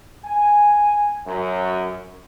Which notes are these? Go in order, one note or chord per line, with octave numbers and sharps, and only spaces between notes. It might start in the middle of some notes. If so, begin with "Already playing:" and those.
G#5
F#2